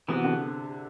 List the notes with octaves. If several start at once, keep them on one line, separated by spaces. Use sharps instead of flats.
C3 E3 B3 F#4
D3